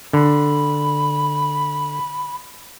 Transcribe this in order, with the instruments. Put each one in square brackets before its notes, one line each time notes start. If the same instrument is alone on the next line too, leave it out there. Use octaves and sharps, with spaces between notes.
[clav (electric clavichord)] D3 [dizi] B5